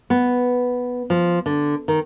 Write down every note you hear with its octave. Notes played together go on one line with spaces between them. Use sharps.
B3
F3
D3
D#3